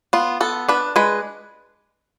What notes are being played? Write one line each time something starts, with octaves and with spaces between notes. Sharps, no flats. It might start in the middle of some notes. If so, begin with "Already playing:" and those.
B3 F4
B3 A4
D4 B4
G#3 B4